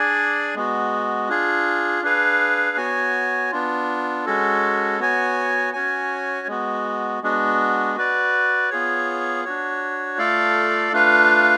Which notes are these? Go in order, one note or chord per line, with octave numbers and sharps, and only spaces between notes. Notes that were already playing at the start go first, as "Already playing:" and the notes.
Already playing: D4 G#4 D5 G#5
G#3 B3 F#4
D4 F4 G#4
D4 G#4 B4 F5
B3 F#4 C#5 G#5
B3 D4 F4
G#3 C#4 F#4 A4
B3 F#4 C#5 G#5
C#4 F#4 C#5 G#5
G#3 B3 F#4
G#3 B3 D4 F#4
F#4 B4 D5
B3 F4 G#4 C#5
D4 F#4 C#5
A3 F4 A4 D5 F5
A3 D4 F4 B4 F5